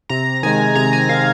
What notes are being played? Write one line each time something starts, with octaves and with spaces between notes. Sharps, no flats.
C3 A#5
D#3 G#3 G#5
C3 A#5
G#5
D#3 G#3 F5